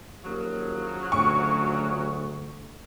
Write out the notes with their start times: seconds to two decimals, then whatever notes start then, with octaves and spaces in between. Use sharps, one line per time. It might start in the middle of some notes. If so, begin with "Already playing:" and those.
0.25 D#2 C#3 F3 F#3
1.12 D2 C#6